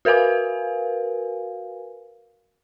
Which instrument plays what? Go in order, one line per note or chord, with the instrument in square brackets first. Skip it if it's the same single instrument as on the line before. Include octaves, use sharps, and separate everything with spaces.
[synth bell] F#4 A#4 B4 F5 G#5